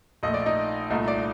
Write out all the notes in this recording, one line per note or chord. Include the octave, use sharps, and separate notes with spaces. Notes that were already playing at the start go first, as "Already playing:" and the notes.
A#1 A#2 A3 D#5
D5
D#4
C2 A#2 A3 D#4
D5